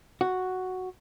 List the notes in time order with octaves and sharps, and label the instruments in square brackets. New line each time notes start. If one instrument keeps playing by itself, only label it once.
[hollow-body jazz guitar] F#4